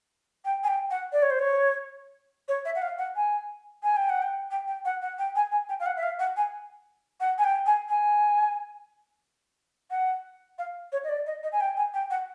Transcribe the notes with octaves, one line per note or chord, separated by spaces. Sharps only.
G5
G#5
G5
F#5
D5
C#5
C5
C#5
C#5
E5
F#5
F5
F#5
G#5
G#5
G5
F#5
G5
G5
G5
F#5
F#5
G5
G#5
G#5
G5
F5
F#5
E5
F5
F#5
G#5
F#5
G#5
G5
G#5
G#5
F#5
F5
C#5
D#5
D5
D#5
D#5
G#5
G5
G#5
G5
F#5